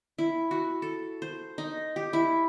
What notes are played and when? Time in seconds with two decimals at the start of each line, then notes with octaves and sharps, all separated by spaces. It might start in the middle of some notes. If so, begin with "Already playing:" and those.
0.19 E4
0.51 F#4
0.82 A4
1.22 C5
1.58 D#4
1.96 G4
2.13 E4